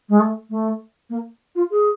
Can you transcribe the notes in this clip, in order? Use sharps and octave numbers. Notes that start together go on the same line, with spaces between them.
G#3
A3
A3
A#3
F4
G#4